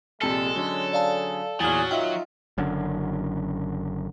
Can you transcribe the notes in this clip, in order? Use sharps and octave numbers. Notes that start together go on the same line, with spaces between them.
A#1 C3 G#3 A4 A5
D3 F#3 C#4 G7
G#4 D5 F5 A5
E2 A#2 F#3 G#4 F6 A6
D#3 D#4 F4 E5 G5
F#1 F#2 D3